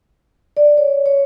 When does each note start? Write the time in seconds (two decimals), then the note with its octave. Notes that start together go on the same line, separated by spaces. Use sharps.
0.57 D5
0.77 C#5
1.06 C#5